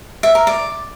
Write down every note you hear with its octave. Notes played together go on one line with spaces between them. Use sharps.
E5
A#4
D5